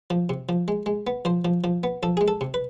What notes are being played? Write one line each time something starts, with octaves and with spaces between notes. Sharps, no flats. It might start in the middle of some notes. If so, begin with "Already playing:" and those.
F3
C3
F3
G#3
G#3
B3
F3 C5
F3
F3
B3
F3 A4
G#3 G#4
A4
C3
B4